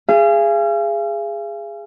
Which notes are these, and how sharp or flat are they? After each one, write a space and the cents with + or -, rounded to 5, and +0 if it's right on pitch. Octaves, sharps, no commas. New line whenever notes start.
G#4 -10 F5 -40